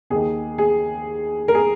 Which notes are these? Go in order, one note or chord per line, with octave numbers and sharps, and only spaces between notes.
D#2 D#3 G#4
G#4
A#4
G#4